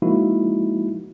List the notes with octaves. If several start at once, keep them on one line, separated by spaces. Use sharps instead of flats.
F3 G#3 A#3 D#4 E4 F#4